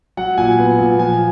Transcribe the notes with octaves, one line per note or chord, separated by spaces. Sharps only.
F#3 F#5
A#2 G#5
B3
A#2
F3 G#5